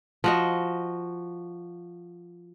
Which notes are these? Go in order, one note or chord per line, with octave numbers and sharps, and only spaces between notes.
F3 F#4 D#5